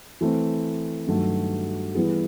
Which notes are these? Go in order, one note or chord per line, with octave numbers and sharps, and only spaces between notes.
E3 A3 C4
G2 D#3 F#3 A3
E3 G3 B3 E4 G#4